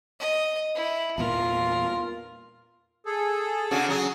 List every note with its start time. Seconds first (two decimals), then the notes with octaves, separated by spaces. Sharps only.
0.19 D#5
0.75 E4
1.18 E2 A#2 E3 F4 A#4
3.06 G#4 A4
3.71 C#3 D4 F#4
3.89 F#3 G#4